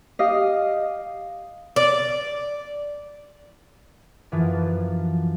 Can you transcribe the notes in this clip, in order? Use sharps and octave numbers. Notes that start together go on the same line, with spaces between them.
G4 D#5 F5
D5
F#2 E3 F3 F4